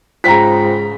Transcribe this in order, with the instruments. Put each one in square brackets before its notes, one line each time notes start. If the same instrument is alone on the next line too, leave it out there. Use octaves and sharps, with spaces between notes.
[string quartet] G#2 C#3 [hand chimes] F4 C5 G5 [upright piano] A#5 B6